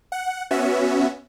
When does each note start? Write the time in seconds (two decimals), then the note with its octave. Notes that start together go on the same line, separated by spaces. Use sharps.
0.12 F#5
0.51 B3 C#4 F#4 E5